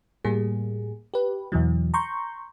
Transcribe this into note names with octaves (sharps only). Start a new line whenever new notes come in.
A2 G3 A#3 G#4
G4 B4
E2 B2 E3 F#3
A#5 C6 C#6 G6